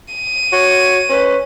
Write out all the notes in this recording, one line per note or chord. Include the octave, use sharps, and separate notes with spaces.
D#7
F#4 C#5
C#4 B4